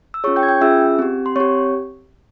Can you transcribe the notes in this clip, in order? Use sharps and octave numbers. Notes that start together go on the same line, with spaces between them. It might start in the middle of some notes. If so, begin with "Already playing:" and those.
E6
C#4 F4 G#4 C#5 C#6
G5 G6
G#6
G5 G6
C#4 F4 G#4 E5 E6
C4 G4
C6
C4 G4 C#5 C#6